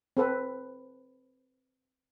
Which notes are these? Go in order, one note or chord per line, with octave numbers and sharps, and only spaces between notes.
C4 A4 B4